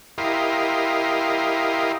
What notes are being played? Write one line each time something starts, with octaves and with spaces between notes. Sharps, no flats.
E4 G4 A#4 D#5 F5 C6